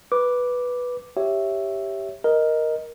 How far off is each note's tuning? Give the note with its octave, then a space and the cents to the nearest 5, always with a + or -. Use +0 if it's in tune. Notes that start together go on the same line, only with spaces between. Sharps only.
B4 -5 D6 +0
G4 +0 C#5 +0 E5 +0
A#4 +5 D#5 +0